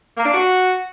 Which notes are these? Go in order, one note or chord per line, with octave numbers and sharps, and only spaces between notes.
A#3
D4
F#4